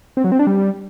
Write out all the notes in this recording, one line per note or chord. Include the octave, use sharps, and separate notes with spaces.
C4
F#3
C4
D4
G3